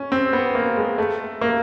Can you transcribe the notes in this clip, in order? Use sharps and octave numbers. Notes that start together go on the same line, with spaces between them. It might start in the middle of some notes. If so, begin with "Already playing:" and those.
Already playing: C#4
C4
B3
A#3
G#3
A3
A#3